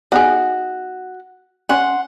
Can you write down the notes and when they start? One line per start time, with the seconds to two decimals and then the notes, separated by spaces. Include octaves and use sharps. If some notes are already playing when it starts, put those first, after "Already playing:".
0.12 B3 D#4 F#4 G#4
1.69 C#4 F#5 G#5 C6